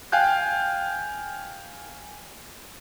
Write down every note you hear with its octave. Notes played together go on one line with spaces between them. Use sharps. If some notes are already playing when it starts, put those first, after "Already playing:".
F5 G5 G#5 F#6 G6